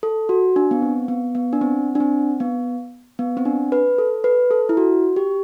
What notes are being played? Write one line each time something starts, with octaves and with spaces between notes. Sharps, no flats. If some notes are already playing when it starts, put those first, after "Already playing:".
A4
F#4
D4
B3
C4
B3
B3
D4
C4
D4
C4
B3
B3
C4
D4
B4
A4
B4
A4
E4
F#4
G4